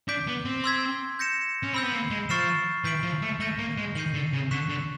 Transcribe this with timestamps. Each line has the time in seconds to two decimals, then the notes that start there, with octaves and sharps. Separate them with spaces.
0.08 D4 D6 G6 B6 D7
0.27 B3
0.45 C4
0.64 C6 E6 G#6 B6
1.19 G6 A#6 C#7 E7
1.63 C#4
1.73 C4 B5 E6 G6
1.83 B3
1.92 A#3
2.11 G#3
2.29 F3 C#6 F6 A6 C7 E7
2.84 E3 G6 B6 D7 F#7
3.03 F3
3.22 A3
3.40 A3 G6 A#6 D#7 G7
3.59 A#3
3.78 G#3
3.95 D#3 G6 C7 D#7 F#7
4.14 D3
4.33 C#3
4.51 D3 C#6 F#6 B6 E7
4.69 D3